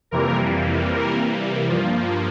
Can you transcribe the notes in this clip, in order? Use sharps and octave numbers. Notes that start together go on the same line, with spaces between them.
F2 C3 E3 G3 A#3 A#4
C3 E3 G3 A#3 A#4
G2 F3 A#3 F4